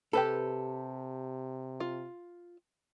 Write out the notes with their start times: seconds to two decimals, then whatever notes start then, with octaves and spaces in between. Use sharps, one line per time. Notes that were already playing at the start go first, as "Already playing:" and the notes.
0.13 C3 G4 A4 B4 B5
1.80 F4